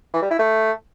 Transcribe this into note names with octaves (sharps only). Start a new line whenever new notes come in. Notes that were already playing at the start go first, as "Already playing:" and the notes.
E3
G3
E4
A3